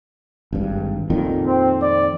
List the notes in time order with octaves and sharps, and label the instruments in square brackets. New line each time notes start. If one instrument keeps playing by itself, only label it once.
[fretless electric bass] G#1 G2
F2 A#2 D#3
[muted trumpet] C4
D5